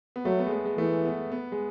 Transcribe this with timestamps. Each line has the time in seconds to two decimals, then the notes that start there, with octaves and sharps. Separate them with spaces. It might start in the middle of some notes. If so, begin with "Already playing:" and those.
0.16 B3
0.25 F#3 A3
0.39 B3
0.46 G#3
0.52 A3
0.65 G#3
0.78 E3 A3
1.05 B3
1.32 B3
1.52 G#3